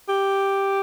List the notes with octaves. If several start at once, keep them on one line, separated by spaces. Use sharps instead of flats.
G4